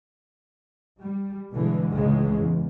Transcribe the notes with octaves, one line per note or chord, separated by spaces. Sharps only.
G3
B2 D3 E3 G#3
C#2 A2 C#3 E3 G#3
E2